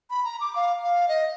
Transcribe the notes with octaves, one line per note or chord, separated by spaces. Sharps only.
B5
A#5
D6
F5
F5
D#5